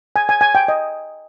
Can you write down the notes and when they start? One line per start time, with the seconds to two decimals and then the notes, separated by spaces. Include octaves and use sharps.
0.16 G#5
0.29 G#5
0.41 G#5
0.55 G5
0.68 D#5